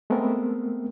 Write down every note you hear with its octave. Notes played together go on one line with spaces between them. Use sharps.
G#3 A3 B3 C4 A#4